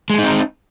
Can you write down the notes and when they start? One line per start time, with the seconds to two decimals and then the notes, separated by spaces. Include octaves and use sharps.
0.10 G#3
0.14 A3
0.18 D#4
0.23 C4